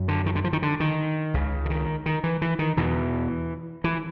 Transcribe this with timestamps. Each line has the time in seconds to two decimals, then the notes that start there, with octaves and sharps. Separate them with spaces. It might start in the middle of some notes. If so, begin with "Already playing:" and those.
Already playing: F#2
0.08 D3
0.26 D#3
0.35 D3
0.44 F3
0.53 D#3
0.62 D3
0.80 D#3
1.34 C#2 C#3
1.65 D3
1.70 D#3
2.06 D#3
2.24 E3
2.42 E3
2.59 D#3
2.77 E2 B2 E3
3.84 E3